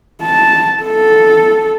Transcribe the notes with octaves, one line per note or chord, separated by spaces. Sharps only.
A5
A4